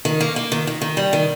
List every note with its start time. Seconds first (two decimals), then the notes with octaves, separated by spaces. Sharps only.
0.05 D#3
0.21 A#3
0.36 A#3
0.52 D#3
0.67 D#3
0.82 D#3
0.97 G3
1.13 D#3